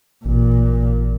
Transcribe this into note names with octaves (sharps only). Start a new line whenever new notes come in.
A1 A#2